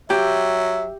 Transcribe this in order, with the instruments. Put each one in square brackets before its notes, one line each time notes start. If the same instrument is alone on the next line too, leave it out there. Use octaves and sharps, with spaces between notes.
[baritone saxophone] F#3 [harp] G4 [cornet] E5